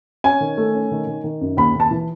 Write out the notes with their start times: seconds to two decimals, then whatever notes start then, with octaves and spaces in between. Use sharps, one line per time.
0.24 C#4 G#5
0.41 D#3
0.57 A3
0.74 C#4
0.91 D#3
1.07 D#3
1.24 D#3
1.41 F#2
1.57 D#2 B5
1.75 D#2 A5
1.91 E3